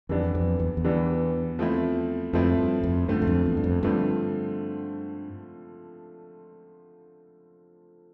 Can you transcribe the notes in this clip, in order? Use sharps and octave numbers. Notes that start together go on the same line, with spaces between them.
F2 E3 G3 B3 D4
F2
E2
E2
E3 G3 B3 D4
F3 A3 C4 E4
F2 F3 A3 C4 E4
G2
F2
G2 D3 F3 A3 C4
G2
F2
E2
G2
F2
G2 D3 F3 A3 C4